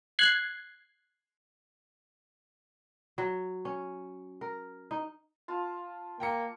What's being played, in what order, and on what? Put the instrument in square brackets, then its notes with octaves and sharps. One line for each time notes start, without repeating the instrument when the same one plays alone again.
[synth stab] F#6 G#6 C7
[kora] F#3
C#4
A#4
D#4
[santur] F4 A5
[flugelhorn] A#3 [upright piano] G5 A#5 C#7